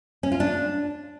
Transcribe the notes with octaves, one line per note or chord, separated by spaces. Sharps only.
C#4
F4
D4